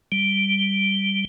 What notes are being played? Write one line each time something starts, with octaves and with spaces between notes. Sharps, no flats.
G3